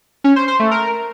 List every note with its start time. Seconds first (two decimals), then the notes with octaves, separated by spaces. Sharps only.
0.24 C#4
0.36 C5
0.48 C5
0.60 A3
0.71 A#4